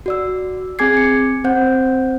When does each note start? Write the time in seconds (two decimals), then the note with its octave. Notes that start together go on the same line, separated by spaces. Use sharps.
0.06 F#4 D5 E6
0.79 C4 G#4 G#5 D6 G#6 C7
0.97 C#7
1.44 C4 C5 F#5 G6